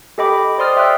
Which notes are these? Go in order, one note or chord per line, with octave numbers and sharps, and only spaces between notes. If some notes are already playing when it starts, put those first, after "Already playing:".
G4 A4 D#5 G5 B5 D6
C5 D5 C6 D#6 F6 A6
D5 E5 G5 C6 E6 F#6